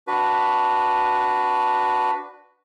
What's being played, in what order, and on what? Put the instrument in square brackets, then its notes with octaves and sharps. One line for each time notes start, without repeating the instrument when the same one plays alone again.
[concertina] D4 F#4 B4